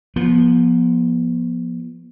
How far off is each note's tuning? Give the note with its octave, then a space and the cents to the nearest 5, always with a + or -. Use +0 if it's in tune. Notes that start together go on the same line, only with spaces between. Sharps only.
F3 +0 B3 -40